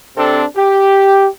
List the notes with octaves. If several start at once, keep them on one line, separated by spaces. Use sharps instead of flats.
C3 C4 D4 A4
G4